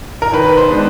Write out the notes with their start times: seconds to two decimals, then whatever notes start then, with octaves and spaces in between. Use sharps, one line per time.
0.22 A#4
0.32 D#3 B4
0.57 C5
0.70 G#3 B3 D4